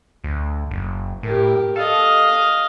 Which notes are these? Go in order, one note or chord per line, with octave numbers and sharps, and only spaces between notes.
D2
F#1
A2 G4 A#4
A4 D#5 F5